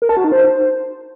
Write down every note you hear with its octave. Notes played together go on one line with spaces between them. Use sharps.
A#4
A5
F#4
D#4
C5